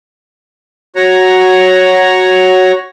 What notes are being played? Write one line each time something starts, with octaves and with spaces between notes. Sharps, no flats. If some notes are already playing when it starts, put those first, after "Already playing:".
F#4 C#5 A#5